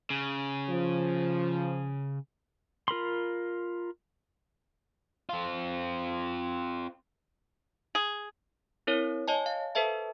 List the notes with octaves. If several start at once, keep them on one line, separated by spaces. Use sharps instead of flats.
C#3
F3
F4 A#4 B5 C6
C4 F4
G#4
C4 E4 A#4 C#5
C#5 D#5 G#5 A5
F5
A4 B4 C5 E5 A5